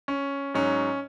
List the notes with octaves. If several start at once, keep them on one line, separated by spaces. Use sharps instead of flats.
C#4
G#2 F#3 C#4